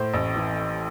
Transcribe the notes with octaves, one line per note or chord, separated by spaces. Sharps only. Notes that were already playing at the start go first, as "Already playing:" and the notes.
Already playing: A2 C5
A1
E3